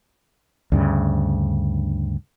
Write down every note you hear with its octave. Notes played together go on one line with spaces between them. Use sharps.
D2 G2 C#3